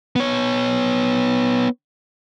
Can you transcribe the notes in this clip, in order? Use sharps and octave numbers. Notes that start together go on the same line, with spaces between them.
B3 C#5